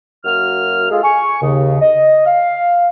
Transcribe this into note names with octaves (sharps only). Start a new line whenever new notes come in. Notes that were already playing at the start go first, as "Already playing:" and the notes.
F#2 F#3 A#3 F#4 F6
G#3 F4 G#4 A4
G#5 C#6
D#2 C#3
D#5
F5